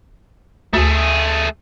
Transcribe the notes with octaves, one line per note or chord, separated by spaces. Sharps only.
D2 A3 G#4